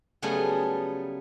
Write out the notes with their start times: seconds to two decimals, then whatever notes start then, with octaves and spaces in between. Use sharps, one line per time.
0.22 C#3 F#3 G3 A3 B3 G#4